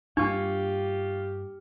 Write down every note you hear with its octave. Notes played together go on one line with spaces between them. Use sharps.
G2 A#3 D4 F4 G4 C#6